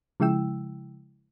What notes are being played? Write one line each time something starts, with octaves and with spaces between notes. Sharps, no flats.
C#3 F3 G#3 E4 G5 E6